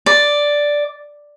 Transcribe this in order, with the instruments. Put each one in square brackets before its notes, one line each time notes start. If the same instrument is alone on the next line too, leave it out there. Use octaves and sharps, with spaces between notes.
[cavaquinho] D5